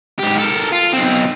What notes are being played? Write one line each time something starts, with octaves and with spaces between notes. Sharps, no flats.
G#2 G4
A4 A#4
F4
B1 C4